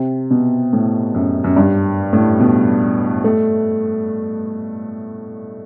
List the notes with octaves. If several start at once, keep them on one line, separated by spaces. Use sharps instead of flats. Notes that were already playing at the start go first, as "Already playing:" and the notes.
Already playing: C3
B2
A2
F#2
F#2
G2
A2
B2
A3